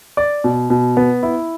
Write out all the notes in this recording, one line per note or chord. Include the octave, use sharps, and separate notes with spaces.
D5
B2
B2
B3
E4